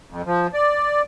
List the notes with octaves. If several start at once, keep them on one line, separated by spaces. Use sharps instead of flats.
F2
F3
D5